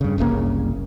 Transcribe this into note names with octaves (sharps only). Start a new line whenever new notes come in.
G2 C#3
F#1 C2 C#3 A#3